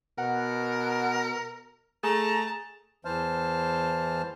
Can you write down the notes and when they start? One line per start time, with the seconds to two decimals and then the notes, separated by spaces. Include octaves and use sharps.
0.18 B2 A#4 F#5
2.03 A3 G#4 A5 A#5
3.05 E2 E3 C5 A5 F6